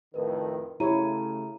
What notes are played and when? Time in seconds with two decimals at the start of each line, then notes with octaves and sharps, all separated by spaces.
0.14 F2 A2 D#3 A#4 B4
0.80 C#3 A3 E4 G4 C#5 A#5 D#7